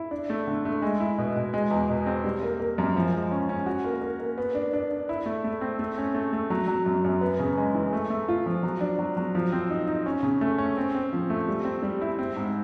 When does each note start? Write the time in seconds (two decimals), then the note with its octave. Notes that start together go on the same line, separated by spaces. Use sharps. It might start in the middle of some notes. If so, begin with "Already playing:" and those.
Already playing: E4
0.11 D4
0.30 A3
0.47 D3
0.65 A3
0.82 G#3
1.00 E4
1.18 B2
1.36 B2
1.54 G#3
1.71 E2
1.89 B2
2.06 C4
2.24 G3
2.43 A#3
2.60 A#3
2.78 F#2
2.96 F3
3.13 G#3
3.31 C#4
3.49 C#4
3.66 F#4
3.85 A#3
4.01 A#3
4.20 A#3
4.38 B3
4.55 D4
4.73 D4
4.91 D4
5.09 E4
5.26 A3
5.44 A3
5.61 C4
5.79 A3
5.98 C#4
6.14 A3
6.33 A3
6.50 F#3
6.68 F#3
6.86 F#2
7.04 F#2
7.21 B3
7.40 C#3
7.57 G#3
7.74 E3
7.93 A3
8.10 A3
8.28 F4
8.46 F3
8.63 F#3
8.81 D4
8.99 F#3
9.17 F#3
9.35 F3
9.52 C4
9.70 D#4
9.87 D#4
10.06 C#4
10.23 C#3
10.41 A3
10.58 C#4
10.77 C4
10.95 C4
11.13 F3
11.30 A3
11.48 G3
11.65 C4
11.83 G3
12.01 E4
12.19 C4
12.36 G#2